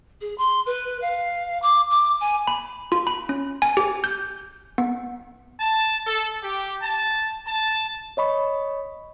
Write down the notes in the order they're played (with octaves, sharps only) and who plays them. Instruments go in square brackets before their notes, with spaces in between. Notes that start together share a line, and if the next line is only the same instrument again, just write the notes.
[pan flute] G#4
C6
B4
F5
D6
D6
G#5
[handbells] B5
F4
B5
C#4
G#5
G4
G6
B3
[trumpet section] A5
A4
G4
A5
A5
[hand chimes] C#5 D#5 B5 C#6